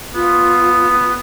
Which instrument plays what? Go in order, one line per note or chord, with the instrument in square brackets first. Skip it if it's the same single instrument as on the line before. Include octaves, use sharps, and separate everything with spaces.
[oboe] B3 [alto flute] F4